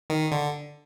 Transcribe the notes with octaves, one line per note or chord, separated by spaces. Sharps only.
D#3
D3